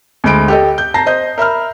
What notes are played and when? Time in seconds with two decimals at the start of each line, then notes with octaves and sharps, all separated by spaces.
0.24 D2 G#3 B5 D7
0.48 G4 A4 D#5
0.78 G6
0.94 A5 A#5 A#6 C7
1.06 C5 D#5 G6
1.38 A#4 E5 B5 F6